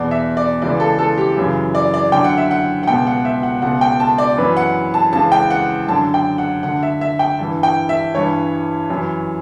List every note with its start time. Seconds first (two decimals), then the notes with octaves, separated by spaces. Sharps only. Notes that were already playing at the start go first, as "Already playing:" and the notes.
Already playing: E2 B2 D5
0.11 E5
0.37 D5
0.62 C#2 C#3 E3 D5
0.80 A4
0.99 A4
1.18 G4
1.36 F#2 C#3 E3
1.75 D5
1.94 D5
2.12 F#2 D3 G5
2.24 F#5
2.38 E5
2.51 F#5
2.83 F#5
2.87 C#2 B2 G5
3.07 F#5
3.25 E5
3.43 F#5
3.62 C#2 B2 F#5
3.81 G5
4.00 A5
4.18 D5
4.37 F#2 E3 B4
4.57 F#5
4.94 A5
5.13 C#2 C#3 E3 A5
5.32 G5
5.50 F#5
5.88 F#2 D3 A5
6.14 G5
6.38 F#5
6.63 D2 D3 F#5
6.83 E5
7.01 E5
7.19 G5
7.39 G2 E3
7.63 G5
7.89 E5
8.14 G2 E3 C#5
8.90 F#2 E3